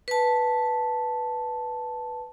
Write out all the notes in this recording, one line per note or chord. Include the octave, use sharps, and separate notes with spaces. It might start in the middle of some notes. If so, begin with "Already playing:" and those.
B4 A5